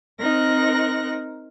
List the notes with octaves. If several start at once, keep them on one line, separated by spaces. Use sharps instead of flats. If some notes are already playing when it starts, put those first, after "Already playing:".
C4 D#4 A#4 F#6 A#6